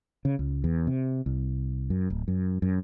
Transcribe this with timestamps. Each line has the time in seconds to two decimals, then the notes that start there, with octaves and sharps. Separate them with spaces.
0.25 C#3
0.39 C#2
0.64 E2
0.87 C3
1.26 C2
1.90 F#2
2.10 D1
2.28 F#2
2.62 F#2